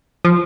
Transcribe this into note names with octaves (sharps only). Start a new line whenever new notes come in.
F3